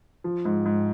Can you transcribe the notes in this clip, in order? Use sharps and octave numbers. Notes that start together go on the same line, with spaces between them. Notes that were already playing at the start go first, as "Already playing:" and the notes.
F3
G#2
G#2